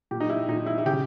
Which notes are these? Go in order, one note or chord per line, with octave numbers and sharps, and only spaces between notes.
A#2 G4
D#4
E4
A#2 D#4
E4
E4
C#3 G4